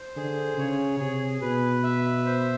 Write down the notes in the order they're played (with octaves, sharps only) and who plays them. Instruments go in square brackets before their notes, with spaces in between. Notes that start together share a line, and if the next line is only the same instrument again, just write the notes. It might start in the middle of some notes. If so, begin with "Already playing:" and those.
Already playing: [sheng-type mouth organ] C5
[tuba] D3 [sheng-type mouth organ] G#4
[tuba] C#3 [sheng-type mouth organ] C#5
[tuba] C3 [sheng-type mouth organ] G#4
[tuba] B2 [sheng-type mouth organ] B4
[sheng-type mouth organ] E5
C5